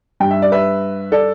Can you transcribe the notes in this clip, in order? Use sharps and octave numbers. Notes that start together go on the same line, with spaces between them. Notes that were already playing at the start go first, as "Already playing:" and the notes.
G2 G3 G5
E5
D5
B4 E5
A4 D5